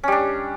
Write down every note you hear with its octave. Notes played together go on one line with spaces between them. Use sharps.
G3 C#4 D4